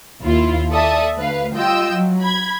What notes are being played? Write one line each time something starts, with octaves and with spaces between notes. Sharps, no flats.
D#2 E4 F4
A4 D5 E5 A5 D#6
D2 B4 F5
G3 F4 D#5 G5 E6
F#3
B5 G#6